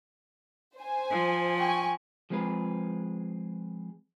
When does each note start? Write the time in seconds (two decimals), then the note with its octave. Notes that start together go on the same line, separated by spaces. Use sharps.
0.77 C5 G#5
1.11 F3
1.59 G5 G#5 C#6
2.30 F3 G#3 C4 G#4 B4